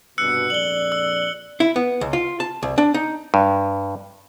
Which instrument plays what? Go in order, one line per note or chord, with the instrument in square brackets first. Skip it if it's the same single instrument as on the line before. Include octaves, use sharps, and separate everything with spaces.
[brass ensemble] C2 G2 B2 [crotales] E6 F#6 C#7
[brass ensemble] A#1 F2 D5 [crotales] F#7 G7
[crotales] E6
[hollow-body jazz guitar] E4
B3
C#2
F4
A5
C2
D4
D#4
[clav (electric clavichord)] G2